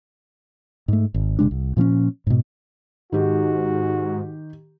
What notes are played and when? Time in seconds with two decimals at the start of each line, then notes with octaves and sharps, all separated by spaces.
0.88 G#2 A3
1.14 G#1
1.39 G1 C3 G#3 D4
1.51 C2
1.77 A#2 F3 C4 C#4
2.27 G#2 B2
3.12 G#2 D#3 F#4 G4